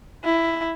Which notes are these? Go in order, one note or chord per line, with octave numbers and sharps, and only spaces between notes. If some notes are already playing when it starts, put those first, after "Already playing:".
E4